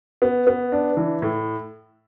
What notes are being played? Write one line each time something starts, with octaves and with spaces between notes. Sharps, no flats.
B3
B3
D4
E3
A2